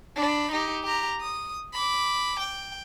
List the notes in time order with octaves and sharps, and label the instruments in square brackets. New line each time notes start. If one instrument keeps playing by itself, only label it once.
[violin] D4 B5
D#4 G4
G4 A#5
D#6
B5 D6
G5